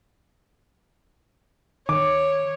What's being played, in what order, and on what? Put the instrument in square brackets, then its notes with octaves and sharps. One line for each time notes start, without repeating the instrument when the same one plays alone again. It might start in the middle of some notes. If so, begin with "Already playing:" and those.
[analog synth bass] D#3 [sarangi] C#5 [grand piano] D6